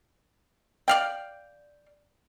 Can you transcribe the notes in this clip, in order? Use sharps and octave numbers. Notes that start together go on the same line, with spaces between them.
D5 F5 G5